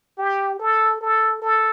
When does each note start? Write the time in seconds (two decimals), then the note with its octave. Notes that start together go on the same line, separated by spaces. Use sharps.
0.18 G4
0.59 A4
1.01 A4
1.42 A4